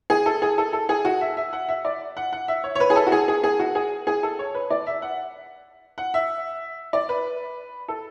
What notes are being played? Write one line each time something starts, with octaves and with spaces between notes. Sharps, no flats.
G#4
A4
G#4
A4
A4
G#4
F#4
E5
E5
F#5
E5
D5
F#5
F#5
E5
C#5
C#5
B4
G#4
A4
F#4
G#4
G#4
G#4
F#4
G#4
G#4
A4
C#5
B4
D5
E5
F#5
F#5
E5
D5
B4
A4